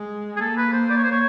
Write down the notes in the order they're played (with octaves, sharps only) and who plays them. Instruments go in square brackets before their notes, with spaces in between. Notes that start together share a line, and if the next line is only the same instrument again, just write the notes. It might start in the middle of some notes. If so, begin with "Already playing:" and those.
Already playing: [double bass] G#3
[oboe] G#4
[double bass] A#3 [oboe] A4
[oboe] B4
C5
D5
C#5
C5
C#5